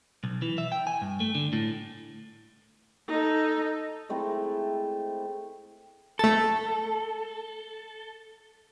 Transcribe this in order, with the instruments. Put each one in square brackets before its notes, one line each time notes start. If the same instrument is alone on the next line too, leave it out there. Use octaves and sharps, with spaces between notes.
[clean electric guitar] B1
E3
E5
G5
G#5
G2
A3
D3
A2
[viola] D#4 A4
[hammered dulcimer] G#3 A3 C4 E4
[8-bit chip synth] A3 A6 [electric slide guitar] A4